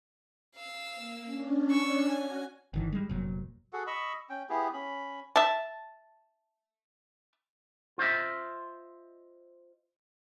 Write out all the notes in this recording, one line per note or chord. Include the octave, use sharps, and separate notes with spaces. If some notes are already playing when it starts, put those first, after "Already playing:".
F5 E6
A#3
C#4 D4
C#6 E6
C#4 F#4 G#5
G1 D#3 E3
G3 G#3
F1 A#2 F#3
F#4 G#4 A4 F#5
D#5 B5 C#6 E6
C#4 G5
B3 E4 G4 G#4
C#4 B5
E5 A5
F4 C5 D#5 E5